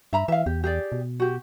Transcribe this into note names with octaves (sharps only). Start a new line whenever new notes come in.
G2 E5 A#5 B5
E3 E5 F5
E2 G4
G4 G#4 D5
B2
F#4 G4